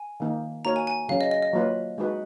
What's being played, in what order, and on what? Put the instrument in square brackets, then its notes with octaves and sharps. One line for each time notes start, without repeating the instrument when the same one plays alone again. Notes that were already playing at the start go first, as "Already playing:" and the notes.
Already playing: [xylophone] G#5
[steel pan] D#3 A#3 D#4
[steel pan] A#3 D#4 F#4 A#4 C#5 [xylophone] A#5
[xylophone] G#5
G#5
[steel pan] C#3 F#3 C#4 [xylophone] F5
[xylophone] D#5
D#5
D#5
[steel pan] F#3 A#3 F4 B4
G#3 D#4 F#4 B4